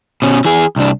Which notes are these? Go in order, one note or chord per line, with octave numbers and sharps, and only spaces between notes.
B2 C#4
E3 G#4
C2 D4